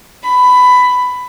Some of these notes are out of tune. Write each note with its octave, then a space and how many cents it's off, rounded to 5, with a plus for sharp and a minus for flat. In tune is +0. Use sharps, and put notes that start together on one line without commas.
B5 +15